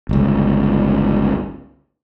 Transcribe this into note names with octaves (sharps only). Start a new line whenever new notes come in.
G1 C#2